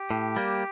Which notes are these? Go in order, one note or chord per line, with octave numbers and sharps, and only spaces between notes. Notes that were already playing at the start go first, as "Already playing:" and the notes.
Already playing: G4
A2
G3 A#3